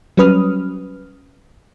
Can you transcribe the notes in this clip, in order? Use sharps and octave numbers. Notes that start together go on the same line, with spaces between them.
F#3 G3 C#4 B4 D#6 F6